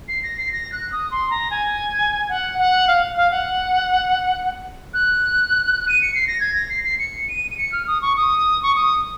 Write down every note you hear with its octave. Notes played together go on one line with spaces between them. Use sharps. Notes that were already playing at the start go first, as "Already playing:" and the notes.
C7
A#6
C7
A#6
F#6
D#6
C6
A#5
G#5
F#5
F#5
F5
F5
F#5
F#6
D#7
C#7
C7
A#6
G#6
A#6
C7
C7
C#7
D#7
D#7
C#7
F6
D#6
C#6
D#6
C#6
D#6